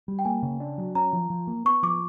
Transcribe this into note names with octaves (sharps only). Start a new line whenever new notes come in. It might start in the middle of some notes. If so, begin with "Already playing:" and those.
G3
G5
A#3 G#5
C#3
D4
F#3
C#4 A#5
F3
F3
A#3
B3 C#6
F3 D6